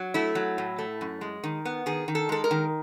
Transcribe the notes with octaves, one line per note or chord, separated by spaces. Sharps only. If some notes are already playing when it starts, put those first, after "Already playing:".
Already playing: F#3
A3 E4
F#3
A2
A3
F#2
G#3
D#3
B3
D#3 G#4
D#3
A4
G#3 A4
A#4
D#3